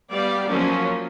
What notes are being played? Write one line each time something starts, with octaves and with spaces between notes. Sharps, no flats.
G3 B3 G4 D5 F5
F3 F#3 A#3 C#4